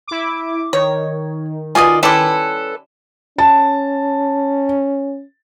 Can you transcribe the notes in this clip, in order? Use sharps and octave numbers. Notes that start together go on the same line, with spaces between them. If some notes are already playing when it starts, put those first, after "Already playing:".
E4 D6
D#3 C#5
B2 F4 D5 D#5 G#5
G3 C#4 E4 A4 B4 A5 C6 D6
C#4 A5